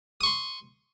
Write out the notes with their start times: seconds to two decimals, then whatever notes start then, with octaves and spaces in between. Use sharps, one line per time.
0.21 D#6
0.23 C#6
0.26 C6